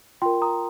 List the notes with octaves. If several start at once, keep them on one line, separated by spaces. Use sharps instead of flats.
F4 A#4 G5 C6
A#5 D#6